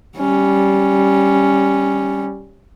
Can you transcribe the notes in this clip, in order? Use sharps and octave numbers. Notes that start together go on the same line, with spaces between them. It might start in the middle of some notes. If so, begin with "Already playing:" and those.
G3 C#4